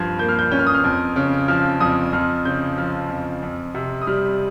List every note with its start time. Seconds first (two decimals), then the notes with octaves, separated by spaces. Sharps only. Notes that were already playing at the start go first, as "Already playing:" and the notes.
Already playing: G2 F3 G#6
0.19 A#3 G6
0.29 F6
0.39 G6
0.51 C#4 G6
0.59 F6
0.67 D#6
0.74 F6
0.84 F2
1.16 C#3
1.48 F3 F6
1.80 F2 D#6
2.13 F2 F6
2.45 C#3 G6
2.78 F3
3.10 F2
3.42 F2
3.75 C3
4.02 D#6
4.07 G3 F6